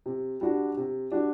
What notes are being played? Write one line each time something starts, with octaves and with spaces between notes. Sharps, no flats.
C3
G3 D4 F#4
C3
G3 D4 F#4